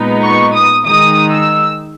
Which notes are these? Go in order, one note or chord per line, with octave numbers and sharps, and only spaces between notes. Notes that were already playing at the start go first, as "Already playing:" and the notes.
Already playing: A#2 G#3 B3 D#4
C#6
D#6
D#3 G#3 D#4 D#6
E6